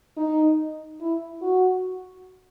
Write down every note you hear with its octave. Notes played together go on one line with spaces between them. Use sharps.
D#4
E4
F#4